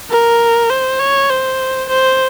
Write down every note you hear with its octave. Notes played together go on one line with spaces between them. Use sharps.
A#4
C5
C#5
C5
C5